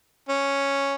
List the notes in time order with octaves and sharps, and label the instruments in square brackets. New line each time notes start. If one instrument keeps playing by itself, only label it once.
[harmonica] C#4